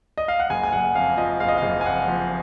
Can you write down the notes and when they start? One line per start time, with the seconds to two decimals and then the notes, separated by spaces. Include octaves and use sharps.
0.18 D#5
0.28 F5
0.40 F#5
0.50 F#1 G#5
0.63 G#5
0.72 F#1 F#5
0.95 F2 F5
1.17 F3 D#5
1.40 F#1 F5
1.48 D#5
1.58 F#1 F5
1.81 G#5
1.85 F2 F#5
2.08 F3